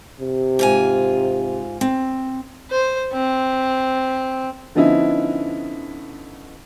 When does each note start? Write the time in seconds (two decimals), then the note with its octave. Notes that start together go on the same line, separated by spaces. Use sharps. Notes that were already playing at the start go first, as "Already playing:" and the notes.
0.20 C3
0.59 G#2 F4 G#5
1.81 C4
2.70 C5
3.12 C4
4.75 D3 F3 B3 C#4 D#4 E4